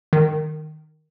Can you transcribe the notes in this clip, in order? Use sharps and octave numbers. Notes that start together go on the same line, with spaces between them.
D#3